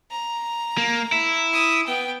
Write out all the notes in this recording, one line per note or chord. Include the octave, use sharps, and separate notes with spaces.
A#5
A#3
E4
D#6
B3 G5